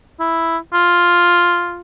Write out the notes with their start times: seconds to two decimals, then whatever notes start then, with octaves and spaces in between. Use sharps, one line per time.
0.20 E4
0.73 F4